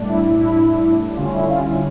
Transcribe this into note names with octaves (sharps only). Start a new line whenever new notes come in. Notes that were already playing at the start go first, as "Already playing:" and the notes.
Already playing: A2 G3 D4
E4
E4
E4
D3 G3 C#4 F4
E4
F4
E4